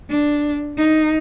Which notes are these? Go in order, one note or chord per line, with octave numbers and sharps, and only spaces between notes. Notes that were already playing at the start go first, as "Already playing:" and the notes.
D4
D#4